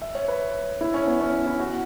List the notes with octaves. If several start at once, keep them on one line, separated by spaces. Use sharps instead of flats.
E5
C#5
B4
E4
C#4
B3
C#4
E4
F#4